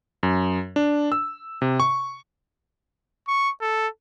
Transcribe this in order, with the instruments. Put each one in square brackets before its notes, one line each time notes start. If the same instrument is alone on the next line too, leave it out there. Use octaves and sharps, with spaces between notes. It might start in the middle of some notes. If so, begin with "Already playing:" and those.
[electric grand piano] F#2
D4
E6
C3
C#6
[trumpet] C#6
A4